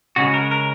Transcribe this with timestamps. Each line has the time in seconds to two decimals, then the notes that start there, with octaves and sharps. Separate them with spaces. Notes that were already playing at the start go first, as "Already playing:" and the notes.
0.16 C#3 G#3 C#4 F#4
0.34 A#4
0.51 A#4